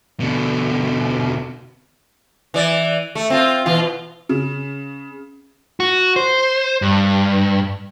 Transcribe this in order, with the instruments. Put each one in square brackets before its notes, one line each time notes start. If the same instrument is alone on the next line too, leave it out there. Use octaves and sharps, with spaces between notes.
[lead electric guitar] B2 D3
[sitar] E3 D5
A3
C4 F4
B2 E3 F4
[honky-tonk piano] C#3
[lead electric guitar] F#4
C5
G2